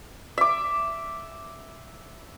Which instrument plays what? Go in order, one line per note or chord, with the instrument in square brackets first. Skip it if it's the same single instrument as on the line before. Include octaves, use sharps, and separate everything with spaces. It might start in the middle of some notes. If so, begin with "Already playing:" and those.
[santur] E5 D6